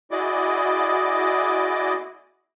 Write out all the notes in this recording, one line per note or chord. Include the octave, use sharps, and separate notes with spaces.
E4 F#4 G#4 D5 D#5 D6